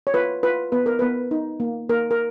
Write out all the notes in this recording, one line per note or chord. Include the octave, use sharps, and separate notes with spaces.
C#5
F4 B4
F4 B4
B3 B4
A#4
B3 B4
D#4
A#3
A#3 A#4
A#4